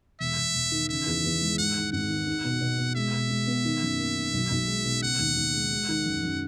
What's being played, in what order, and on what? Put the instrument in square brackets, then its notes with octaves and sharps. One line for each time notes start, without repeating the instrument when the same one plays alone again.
[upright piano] E1 [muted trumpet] E5
[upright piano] E1
E1
D#3
[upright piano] C#3 [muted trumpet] E5
[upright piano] E2
E2
G#3
[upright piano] G#2 [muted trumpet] F#5
[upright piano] D#3
[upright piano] G#1 [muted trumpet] F#5
[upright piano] D#3
D#4
B2
B2
B2
[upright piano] G#3 [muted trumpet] E5
[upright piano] B2
G#3
B3
D#3
F#2
A#3
D#3
B1
B1
G#3
B2
[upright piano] C#3 [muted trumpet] F#5
[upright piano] D#2
D#2
G#3
G#3
D#3
F#2
F#2